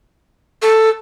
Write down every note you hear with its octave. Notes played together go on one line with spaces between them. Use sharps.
A4